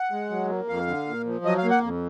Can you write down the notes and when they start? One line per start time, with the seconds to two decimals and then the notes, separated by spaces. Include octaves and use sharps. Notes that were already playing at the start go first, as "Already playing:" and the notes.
Already playing: F#5
0.12 G#3
0.31 F#3
0.49 A#3
0.68 F2 F5
0.87 D3
1.07 A#2
1.26 F3
1.45 F#3 D#5
1.58 F5
1.64 A#3
1.70 F#5
1.83 F2